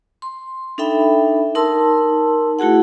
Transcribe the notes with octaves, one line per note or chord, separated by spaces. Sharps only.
C6
D4 D#4 A4 E5 G5 B5
D#4 A#4 A5 C6 E6
A3 E4 F#4 G#4 F#5